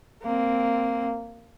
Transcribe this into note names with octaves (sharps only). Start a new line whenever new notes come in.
A#3 C4